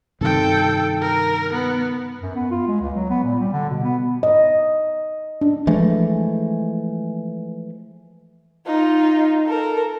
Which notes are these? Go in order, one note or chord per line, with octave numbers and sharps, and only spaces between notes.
G2 C3 D#3 A4 G5
A#4
B3
F#2
B3
F4
G#3
C#2
F#3
B3
A#2
G3
D3
B2
B3
D#5
D4
E3 F3 G#3 A3
D#4 F4
A4 A#4